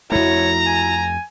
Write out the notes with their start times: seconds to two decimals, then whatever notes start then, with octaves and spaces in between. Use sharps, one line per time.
0.12 F2 A3 E4 F#4 C#5 A#5
0.66 G#5